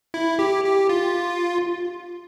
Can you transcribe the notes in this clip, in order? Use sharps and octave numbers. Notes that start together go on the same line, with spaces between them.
E4
G4
G4
F4